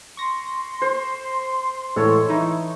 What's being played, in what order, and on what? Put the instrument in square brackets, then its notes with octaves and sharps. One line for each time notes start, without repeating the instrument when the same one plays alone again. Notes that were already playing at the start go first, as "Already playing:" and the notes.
[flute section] C6 [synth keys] C#6 A#6
[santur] C5
[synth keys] A2 E3 G#3 [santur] A4 C#5
[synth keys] E3 D#4 E4